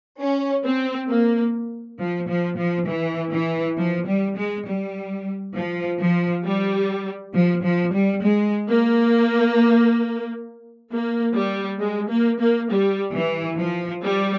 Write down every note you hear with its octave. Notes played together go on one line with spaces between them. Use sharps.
C#4
C4
A#3
F3
F3
F3
E3
E3
F3
G3
G#3
G3
F3
F3
G3
F3
F3
G3
G#3
A#3
A#3
G3
G#3
A#3
A#3
G3
E3
F3
G3